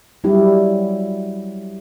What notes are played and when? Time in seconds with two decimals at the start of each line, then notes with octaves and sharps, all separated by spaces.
0.24 F#3 G3 E4 G4